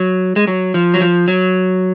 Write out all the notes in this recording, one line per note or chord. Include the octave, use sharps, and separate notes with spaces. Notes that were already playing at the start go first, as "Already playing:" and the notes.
Already playing: F#3
G#3
F#3
F3
F#3
F3
F#3